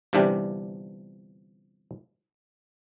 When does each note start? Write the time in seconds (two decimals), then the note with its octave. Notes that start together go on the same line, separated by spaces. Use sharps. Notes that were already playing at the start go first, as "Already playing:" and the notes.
0.13 G1 G2 C3 E3 D4 G4